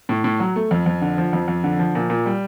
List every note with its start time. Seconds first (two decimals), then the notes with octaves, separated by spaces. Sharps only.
0.09 A2
0.24 A2
0.40 F#3
0.56 A3
0.71 F2
0.86 F2
1.02 D3
1.18 F3
1.33 F2
1.48 F2
1.64 D3
1.79 F3
1.95 A#2
2.10 A#2
2.26 G3